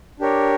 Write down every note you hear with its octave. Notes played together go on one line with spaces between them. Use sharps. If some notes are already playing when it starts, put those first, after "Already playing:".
D4 G4 A#4 C#5